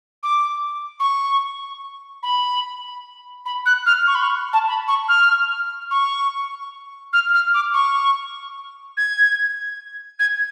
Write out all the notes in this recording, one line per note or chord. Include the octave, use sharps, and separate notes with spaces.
D6
C#6
B5
B5
F#6
F6
C#6
B5
C#6
A5
B5
C#6
F6
C#6
F6
F6
D6
C#6
G#6
G#6